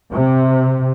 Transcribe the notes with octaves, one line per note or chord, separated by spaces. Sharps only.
C3